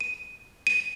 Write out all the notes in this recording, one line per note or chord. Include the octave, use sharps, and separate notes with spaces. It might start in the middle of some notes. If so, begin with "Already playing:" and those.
D#7
D#7